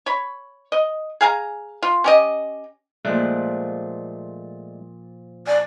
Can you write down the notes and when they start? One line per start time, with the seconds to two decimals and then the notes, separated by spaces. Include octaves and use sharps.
0.06 C#5 B5
0.72 D#5
1.21 G#4 F5 G#5 A#5
1.82 F4
2.04 C#4 G4 D#5
3.05 A#2 F3 G#3 A3 D4 F#6
5.47 D5 G#5